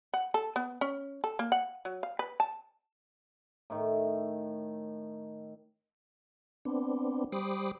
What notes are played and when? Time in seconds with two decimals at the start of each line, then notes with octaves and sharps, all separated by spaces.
0.14 F#5
0.34 A4
0.56 B3
0.81 C#4
1.24 A4
1.39 A#3
1.52 F#5
1.85 F#3
2.03 F5
2.19 B4
2.40 A5
3.70 A2 D#3
6.65 B3 C4 D4
7.32 G3 C5 B5 D6 D#6